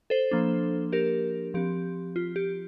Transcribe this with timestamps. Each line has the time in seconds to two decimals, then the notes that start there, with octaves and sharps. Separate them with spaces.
0.10 A4 C5
0.31 F3 A#3 D4
0.92 G4 A#4
1.54 F3 C4 G4
2.16 F4
2.36 G4